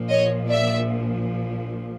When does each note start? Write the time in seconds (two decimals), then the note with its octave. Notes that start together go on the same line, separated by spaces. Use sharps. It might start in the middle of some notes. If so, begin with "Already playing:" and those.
Already playing: A#1 A#2 F3
0.10 C#5 D#5
0.50 D5 E5